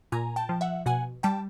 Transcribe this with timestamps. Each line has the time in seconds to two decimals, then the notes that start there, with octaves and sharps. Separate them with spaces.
0.12 A#2 G#5 A#5
0.36 G5 A5
0.49 F3
0.61 E5 F#5
0.86 B2 F#5 G#5
1.23 G3 G5 A5